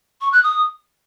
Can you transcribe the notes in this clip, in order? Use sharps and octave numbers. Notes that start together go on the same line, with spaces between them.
C#6
F#6
D#6